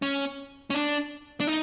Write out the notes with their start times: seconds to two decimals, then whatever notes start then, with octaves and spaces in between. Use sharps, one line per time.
0.02 C#4
0.70 C#4
0.74 D4
1.40 D4
1.47 D#4